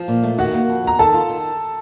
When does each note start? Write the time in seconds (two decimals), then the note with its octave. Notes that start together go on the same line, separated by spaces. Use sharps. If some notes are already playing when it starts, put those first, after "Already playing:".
Already playing: F3 F5
0.08 A#2
0.23 A3
0.38 D#3 F#4 F#5
0.54 A#3
0.69 F2
0.84 D#3 A#5
0.99 D#3 A4 A5
1.14 F4
1.29 D#3